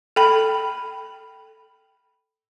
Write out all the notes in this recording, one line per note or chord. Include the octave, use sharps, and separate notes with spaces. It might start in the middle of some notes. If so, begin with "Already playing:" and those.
A4 G5 B5